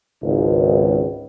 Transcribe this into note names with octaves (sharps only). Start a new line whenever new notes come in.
G#1 C#2